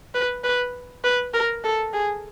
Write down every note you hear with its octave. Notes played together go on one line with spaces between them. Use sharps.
B4
B4
B4
A#4
A4
G#4